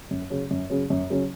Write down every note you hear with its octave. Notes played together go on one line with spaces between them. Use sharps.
F#2
C#3 F#3 C#4
F#2
C#3 F#3 C#4
F#2
C#3 F#3 C#4